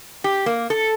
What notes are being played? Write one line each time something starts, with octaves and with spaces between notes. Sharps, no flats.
G4
A#3
A4